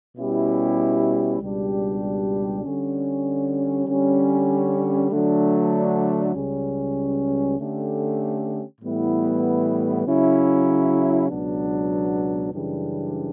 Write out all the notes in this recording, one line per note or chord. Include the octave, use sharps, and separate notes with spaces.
B2 G3 C#4 E4 G4
C#2 B2 G3 D4 G4
D3 G3 C#4
D3 G3 C#4
D3 F#3 A3 D4
C#2 C#3 G3 C#4
D3 A3 C#4 G4
A2 E3 G3 B3 E4
C#3 F#3 C#4 E4
C#2 B2 F#3 B3 D4
F#2 C#3 E3 G3 D4